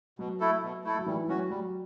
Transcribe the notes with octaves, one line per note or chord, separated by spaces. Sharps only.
B2 F#3
A3 E4 A4
B2
A3 E4 A4
F#3
E3 G3
F#3 C#4 F#4
F#3 G3